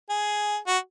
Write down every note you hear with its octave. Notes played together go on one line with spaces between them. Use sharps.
G#4
F#4